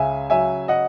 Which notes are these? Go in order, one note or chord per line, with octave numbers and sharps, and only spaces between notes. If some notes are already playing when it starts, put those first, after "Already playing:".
Already playing: C#2 C#3 E5 G#5
F#3 E5 G#5
D#5 F#5